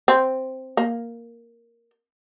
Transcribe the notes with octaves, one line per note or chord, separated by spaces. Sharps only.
C4
A#3